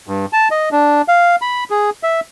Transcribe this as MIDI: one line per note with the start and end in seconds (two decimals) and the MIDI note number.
0.08 0.26 43
0.33 0.48 81
0.51 0.69 75
0.72 1.02 62
1.08 1.36 77
1.42 1.64 83
1.70 1.90 68
2.03 2.20 76